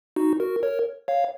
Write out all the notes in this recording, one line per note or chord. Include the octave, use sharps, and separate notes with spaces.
D#4 F#4
F#4 A#4
A#4 C#5
C#5 F5